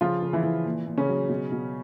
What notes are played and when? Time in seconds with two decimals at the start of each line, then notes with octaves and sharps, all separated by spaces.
0.01 C#3 F3 F4
0.22 C#3
0.33 E3 E4
0.43 E3
0.66 A#2
0.87 A#2
0.98 C#3 C#4
1.09 F#3
1.29 B2
1.52 B2